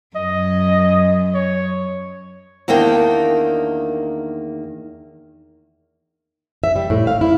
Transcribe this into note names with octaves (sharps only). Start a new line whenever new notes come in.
F#2 D#5
C#5
E2 D#3 A#3 D4 G5
E5
G3
A2
F5
E4